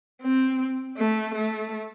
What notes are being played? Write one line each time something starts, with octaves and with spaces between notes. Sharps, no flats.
C4
A3
A3